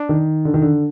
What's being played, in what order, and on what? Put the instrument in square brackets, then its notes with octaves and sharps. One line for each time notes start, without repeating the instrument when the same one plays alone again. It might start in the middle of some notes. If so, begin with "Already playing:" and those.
Already playing: [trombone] D4
[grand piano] D#3
D3
D#3
D3